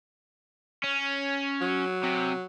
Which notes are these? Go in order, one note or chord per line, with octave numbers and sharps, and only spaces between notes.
C#4
F#3
C3